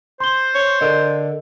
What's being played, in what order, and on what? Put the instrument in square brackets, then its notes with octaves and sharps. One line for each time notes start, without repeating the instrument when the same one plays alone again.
[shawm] C5 [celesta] C6 G7
[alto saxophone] C#5
[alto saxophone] D3 [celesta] A4 A#4 D#5